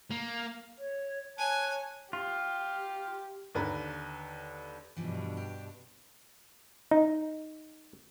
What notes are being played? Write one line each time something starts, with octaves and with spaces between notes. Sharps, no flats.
A#3
C#5
C#5 G#5 A5 F#6
F4 G4
D#2 D3 B4 A#5
G2 B2 E3 F3 D4
G4
D#4